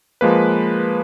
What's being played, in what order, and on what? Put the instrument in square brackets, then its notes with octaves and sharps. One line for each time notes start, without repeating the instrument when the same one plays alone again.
[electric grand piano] F3 G#3 A#3 B4